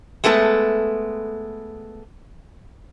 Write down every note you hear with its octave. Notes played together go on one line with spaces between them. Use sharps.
G#3 A3 B3 G4 A4